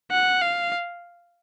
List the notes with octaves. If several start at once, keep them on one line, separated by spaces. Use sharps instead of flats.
F#5
F5